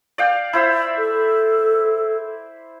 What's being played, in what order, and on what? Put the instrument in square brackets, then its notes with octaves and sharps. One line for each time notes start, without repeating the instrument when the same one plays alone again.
[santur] D5 F5 G5
E4 C5 E5
[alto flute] A4